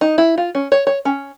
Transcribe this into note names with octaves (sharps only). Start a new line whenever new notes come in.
D#4
E4
F4
C#4
C#5
C#5
C#4